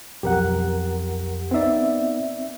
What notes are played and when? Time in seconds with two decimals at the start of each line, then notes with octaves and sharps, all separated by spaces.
0.23 B1 F2 G4 A#4 F#5
1.51 B3 C4 D#4 D5 E5